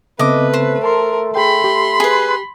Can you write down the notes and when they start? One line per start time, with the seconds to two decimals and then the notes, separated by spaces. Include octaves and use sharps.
0.19 C#3 A3 B3 C4 B4 D#5 D6
0.54 C5
0.84 A#4 A5 C6
1.35 G#4 G5 B5 C6
1.64 G4
2.00 G#4 B4